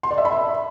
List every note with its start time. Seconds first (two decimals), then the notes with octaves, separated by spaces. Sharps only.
0.03 C6
0.11 D5
0.18 E5
0.25 B5
0.32 E5